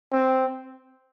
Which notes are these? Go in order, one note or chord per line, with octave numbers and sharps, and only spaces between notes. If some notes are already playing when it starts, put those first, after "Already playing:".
C4